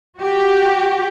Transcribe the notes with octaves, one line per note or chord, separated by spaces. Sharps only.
F#4 G4